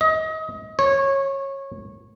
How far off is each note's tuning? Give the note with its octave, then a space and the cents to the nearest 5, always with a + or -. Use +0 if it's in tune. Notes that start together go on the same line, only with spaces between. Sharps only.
D#5 +30
C#5 -20